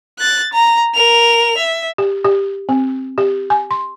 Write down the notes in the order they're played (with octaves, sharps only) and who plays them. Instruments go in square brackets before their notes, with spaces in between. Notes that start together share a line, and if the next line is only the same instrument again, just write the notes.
[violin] F#6 A6
A#5
A#4 F7
E5
[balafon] G4
G4
C4
G4
G#5
C6